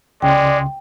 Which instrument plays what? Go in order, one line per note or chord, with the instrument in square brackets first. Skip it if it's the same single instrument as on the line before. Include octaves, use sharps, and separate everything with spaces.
[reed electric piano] C#2 C#3 C6 [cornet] G#3 [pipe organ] D5 [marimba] G5